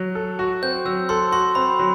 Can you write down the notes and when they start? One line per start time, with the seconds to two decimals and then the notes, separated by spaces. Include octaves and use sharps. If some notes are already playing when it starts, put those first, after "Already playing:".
Already playing: F#3
0.15 A4
0.39 F#4
0.62 C4 G6
0.85 F#3 E6
1.09 A4 C6
1.32 F#4 C6
1.55 C4 B5
1.79 F#3